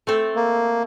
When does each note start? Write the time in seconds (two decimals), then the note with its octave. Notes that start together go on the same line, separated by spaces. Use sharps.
0.07 A3 C4 A4
0.36 A#3